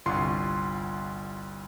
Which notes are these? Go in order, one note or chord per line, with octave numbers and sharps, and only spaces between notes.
G1 C2 F4 C6 C#6